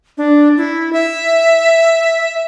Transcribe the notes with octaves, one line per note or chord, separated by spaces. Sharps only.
D4
E4
E5